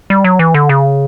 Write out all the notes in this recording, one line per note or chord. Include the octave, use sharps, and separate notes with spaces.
G3
F#3
E3
D3
C#3